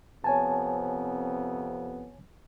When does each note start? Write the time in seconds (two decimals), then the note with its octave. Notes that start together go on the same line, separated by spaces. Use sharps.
0.24 F2 C3 B3 C#5 G#5 A5